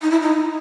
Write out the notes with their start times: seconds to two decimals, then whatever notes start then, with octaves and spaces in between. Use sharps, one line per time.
0.02 D#4
0.11 E4
0.21 D#4